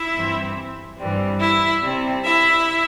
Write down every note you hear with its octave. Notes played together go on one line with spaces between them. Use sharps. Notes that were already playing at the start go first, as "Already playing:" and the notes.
Already playing: E4 E5
G2 E3 C4
G2 E3 G3 C4
E4 E5
C3 G3 C4
E4 E5